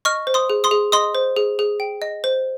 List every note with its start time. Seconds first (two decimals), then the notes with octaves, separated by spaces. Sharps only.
0.05 D#5 C#6 F6
0.27 C5
0.34 C6 D#6
0.50 G#4
0.64 C6 D#6
0.71 G#4
0.92 D#5 C6 D#6
1.15 C5
1.36 G#4
1.59 G#4
1.80 G5
2.02 D#5
2.24 C5